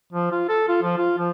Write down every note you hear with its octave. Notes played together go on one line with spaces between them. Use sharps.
F3
F4
A4
F4
F3
F4
F3